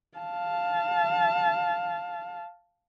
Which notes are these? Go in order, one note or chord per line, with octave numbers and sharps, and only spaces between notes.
F5 A5